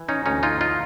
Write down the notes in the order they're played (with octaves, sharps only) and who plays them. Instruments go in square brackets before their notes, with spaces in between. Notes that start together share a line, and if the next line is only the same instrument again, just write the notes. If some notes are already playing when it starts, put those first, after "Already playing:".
Already playing: [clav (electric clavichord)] E3
C#4 D#4
D2 C#4 D#4
D#4 F4
E3 D#4 F4